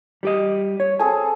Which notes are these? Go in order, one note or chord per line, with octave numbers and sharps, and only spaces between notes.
G3 G4 D#5
C#5
C4 G#4 A4 G#5